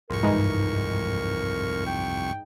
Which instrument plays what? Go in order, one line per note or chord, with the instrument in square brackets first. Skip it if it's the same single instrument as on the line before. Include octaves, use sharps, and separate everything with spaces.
[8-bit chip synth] C2 F2 C#6 [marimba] G#2 [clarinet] A#4
[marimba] G2 [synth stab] E3 G#3 D#4
[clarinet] G5